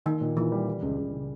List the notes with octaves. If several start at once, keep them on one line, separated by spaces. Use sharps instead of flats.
D#3 A#3
A#2
A#2 E3
G3
G3
C#2
C#2
C#3